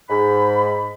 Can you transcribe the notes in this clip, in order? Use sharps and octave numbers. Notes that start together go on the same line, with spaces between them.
G#2 B5